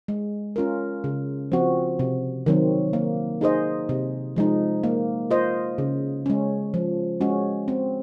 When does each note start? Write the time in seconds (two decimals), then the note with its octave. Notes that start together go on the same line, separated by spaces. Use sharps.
0.08 G#3
0.56 C#4 F4 A#4
1.04 C#3
1.52 F3 C4 F#4
1.99 C3
2.46 D#3 F#3 C4
2.93 A#3
3.41 D#4 G#4 C5 D#5
3.89 C3
4.36 F3 G#3 D#4
4.84 A#3
5.31 F4 C5 D#5
5.78 C#3
6.26 G#3 C#4
6.74 F3
7.21 G#3 C#4 F#4
7.68 C4